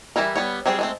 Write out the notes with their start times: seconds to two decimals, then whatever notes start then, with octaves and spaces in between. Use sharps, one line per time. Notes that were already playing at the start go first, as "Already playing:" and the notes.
0.16 E3 G3 E4 A#4
0.36 G3 B3 C#5
0.66 F#3 G3 C4 F4 G#4
0.79 G#3 A3 C4